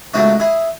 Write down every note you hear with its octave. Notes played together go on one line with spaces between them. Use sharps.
C#2 B2 F#3 A3 D#4 F#4
E4 G#4